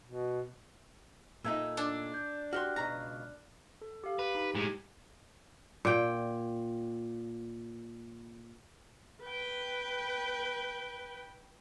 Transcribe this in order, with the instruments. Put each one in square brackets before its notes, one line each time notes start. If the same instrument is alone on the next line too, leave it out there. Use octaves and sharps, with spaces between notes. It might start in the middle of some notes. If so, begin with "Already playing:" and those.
[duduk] B2
[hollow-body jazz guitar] A#2 A3 D#4 [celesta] E6 G#6
[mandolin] D4
[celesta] G6
[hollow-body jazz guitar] F#4 G4 C6 [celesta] F6 F#6
[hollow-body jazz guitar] C#2 B2 A#5
[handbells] A4
G4 F5
[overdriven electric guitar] B4
[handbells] D#4 G4
[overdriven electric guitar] A2 G#3 [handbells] G4 G#6
[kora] A#2 G5
[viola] B4 G5